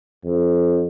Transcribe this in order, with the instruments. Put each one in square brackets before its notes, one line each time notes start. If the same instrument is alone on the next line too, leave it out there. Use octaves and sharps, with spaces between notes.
[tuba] F2